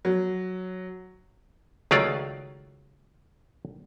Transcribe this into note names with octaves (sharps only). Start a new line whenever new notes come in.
F#3
C#2 D#3 F#3 A3 F4 D5